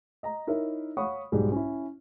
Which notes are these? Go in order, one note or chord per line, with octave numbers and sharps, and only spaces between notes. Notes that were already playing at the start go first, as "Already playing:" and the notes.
D#5 A#5
D#4 E4 A#4 C#5 E5
C#5 F5 F#5 B5 C#6 D#6
B1 G#2 G3 G#3
C#4 E4